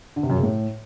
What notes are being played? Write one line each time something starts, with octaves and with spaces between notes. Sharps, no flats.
D3
C3
F#2
C#3
A2